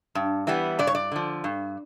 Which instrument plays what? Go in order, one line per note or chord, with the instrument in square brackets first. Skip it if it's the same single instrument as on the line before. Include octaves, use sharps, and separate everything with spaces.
[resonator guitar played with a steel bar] G2
E3 G3 B3
G2 D5
C#5
D5
D3 F3
G2